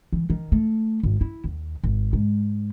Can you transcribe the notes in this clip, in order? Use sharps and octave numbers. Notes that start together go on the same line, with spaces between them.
E3
D#3
A3
G#1
E4
D#2
G#1
G#2